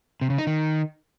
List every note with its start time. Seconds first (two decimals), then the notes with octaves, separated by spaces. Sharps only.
0.21 C3
0.30 C#3
0.38 D#4
0.47 D#3